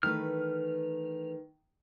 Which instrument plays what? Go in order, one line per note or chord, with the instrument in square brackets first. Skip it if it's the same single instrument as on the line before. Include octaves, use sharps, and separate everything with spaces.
[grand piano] D#3 [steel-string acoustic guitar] E3 A3 B4 [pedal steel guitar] F6